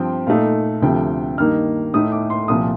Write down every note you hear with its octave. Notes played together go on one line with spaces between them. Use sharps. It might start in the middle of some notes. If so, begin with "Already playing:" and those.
Already playing: G2 F3 C4 G5
A#2 A3 D#4 F5
D2 C3 F3 G5
G2 D#3 A#3 D#4 F6
A2 A3 D#4 D#6
D6
C6
C2 A#2 F3 D#6